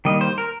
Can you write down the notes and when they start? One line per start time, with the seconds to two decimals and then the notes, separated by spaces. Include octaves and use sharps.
0.05 D#3 G3 A#3 D#5
0.21 C5
0.38 A#4